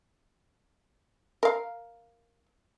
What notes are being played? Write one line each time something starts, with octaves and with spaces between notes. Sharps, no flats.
A#4 F5